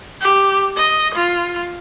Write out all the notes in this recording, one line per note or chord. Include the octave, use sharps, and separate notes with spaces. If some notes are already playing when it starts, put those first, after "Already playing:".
G4
D#5
F4